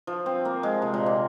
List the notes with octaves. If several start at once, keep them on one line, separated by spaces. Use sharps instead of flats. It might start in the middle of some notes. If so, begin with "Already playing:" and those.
F3
C4
A#3
G#3
C3
A#2
C3